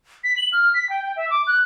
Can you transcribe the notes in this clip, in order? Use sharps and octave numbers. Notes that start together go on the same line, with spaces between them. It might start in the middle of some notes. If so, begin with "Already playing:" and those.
B6
F#7
F6
B6
G5
G5
E5
D6
F#6